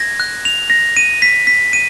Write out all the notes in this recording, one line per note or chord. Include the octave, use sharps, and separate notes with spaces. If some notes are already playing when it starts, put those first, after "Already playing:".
Already playing: G#6 A#6
F#6
F7
A#6
D#7
B6
B6
D#7